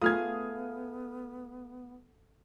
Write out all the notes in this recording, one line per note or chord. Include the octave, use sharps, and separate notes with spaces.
A3 B3 F4 G#4 F5 D#6 F6 G#6